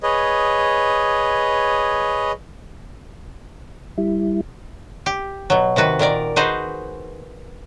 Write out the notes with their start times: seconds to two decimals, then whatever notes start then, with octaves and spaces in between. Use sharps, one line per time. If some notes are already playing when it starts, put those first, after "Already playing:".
0.03 G#4 B4 C#5 D#5
3.98 G3 E4
5.06 G4
5.50 B2 F#3
5.76 C3 D#3 F#4 B4
5.99 A#2 D#3 A#4 D5
6.36 D#4 F#4 G#4 B4 C5